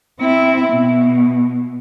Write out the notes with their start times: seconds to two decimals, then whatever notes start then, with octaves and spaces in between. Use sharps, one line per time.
0.20 C4 E4
0.72 B2